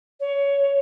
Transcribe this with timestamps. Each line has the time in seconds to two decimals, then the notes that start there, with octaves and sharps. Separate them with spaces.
0.20 C#5